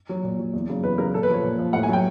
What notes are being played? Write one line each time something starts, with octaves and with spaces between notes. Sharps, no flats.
F#3
A#2
F#3
E2
C#3 F#3
E2 B4
C#3 F#3 A#4
A#2 A4
B4
F3 C#5
A#2
F3
A2 F#5
G#5
F#3 G5